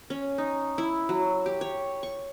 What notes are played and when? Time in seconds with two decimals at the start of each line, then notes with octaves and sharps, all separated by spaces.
0.10 C#4
0.38 D#4
0.78 E4
1.09 F#3
1.46 G4
1.61 C#5
2.03 C#6